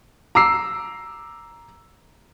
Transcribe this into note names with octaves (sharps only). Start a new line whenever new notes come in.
A#5 D6 E6 C7